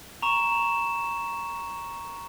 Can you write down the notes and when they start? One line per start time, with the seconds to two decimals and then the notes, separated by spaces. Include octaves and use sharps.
0.22 A#5 C#6 E7